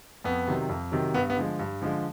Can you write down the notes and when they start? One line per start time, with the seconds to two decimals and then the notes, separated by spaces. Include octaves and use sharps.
0.24 F2 B3
0.47 C3 D#3 F#3
0.69 F2
0.92 C3 D#3 F#3
1.14 G2 B3
1.30 B3
1.37 D3 F3 G#3
1.59 G2
1.82 D3 F3 G#3